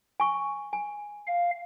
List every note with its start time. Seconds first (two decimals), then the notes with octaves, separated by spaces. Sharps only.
0.20 G#5 C#6
0.73 G#5
1.27 F5